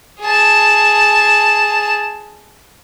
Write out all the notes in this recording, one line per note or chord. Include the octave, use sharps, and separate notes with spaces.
G#4 A5